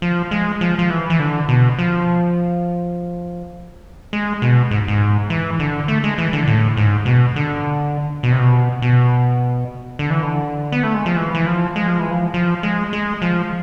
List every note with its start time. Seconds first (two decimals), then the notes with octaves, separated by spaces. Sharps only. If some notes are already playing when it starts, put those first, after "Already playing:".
0.02 F3
0.31 G#3
0.61 F3
0.79 F3
0.90 E3
1.10 E3
1.19 D3
1.49 B2
1.79 F3
4.13 G#3
4.42 B2
4.71 G#2
4.88 G#2
5.30 E3
5.59 D3
5.88 A3
6.04 G#3
6.18 E3
6.33 D3
6.48 A2
6.77 G#2
7.06 B2
7.36 D3
8.23 B2
8.32 C3
8.39 B2
8.82 B2
9.99 D3
10.10 E3
10.22 D3
10.72 B3
10.83 A3
10.94 G#3
11.06 F3
11.17 E3
11.35 E3
11.47 F3
11.76 G#3
11.88 F3
11.99 E3
12.11 F3
12.34 F3
12.63 G#3
12.93 G#3
13.22 F3